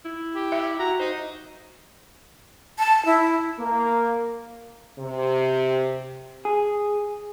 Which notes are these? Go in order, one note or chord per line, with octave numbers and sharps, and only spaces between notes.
E4
G4
E5
F#4 A#5
D#4 C5
A5
E4
A#3
C3
G#4